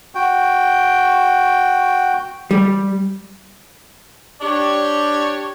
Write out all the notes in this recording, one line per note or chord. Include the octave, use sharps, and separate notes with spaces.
F#4 G5
G3
D4 G4 C#5